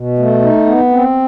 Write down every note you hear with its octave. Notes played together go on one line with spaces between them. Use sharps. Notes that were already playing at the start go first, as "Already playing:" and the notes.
Already playing: B2
A3
D#4
B3
C4